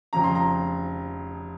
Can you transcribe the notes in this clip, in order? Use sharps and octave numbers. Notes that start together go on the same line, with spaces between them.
F1 F2 C#3 A#5
C6
A#5